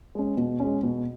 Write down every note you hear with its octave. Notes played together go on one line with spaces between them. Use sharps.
G#3 C#4
B2
G#3 C#4
B2